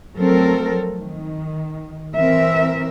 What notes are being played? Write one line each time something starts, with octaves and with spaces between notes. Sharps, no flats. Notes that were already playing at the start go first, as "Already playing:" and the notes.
F3 F#3 A3 C4 A4 A#4
D#3
E3 C4 A#4 E5